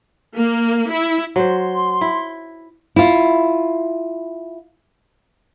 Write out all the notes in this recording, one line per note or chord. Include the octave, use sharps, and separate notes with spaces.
A#3
E4
F#3 C5 C6
E4
E4 F4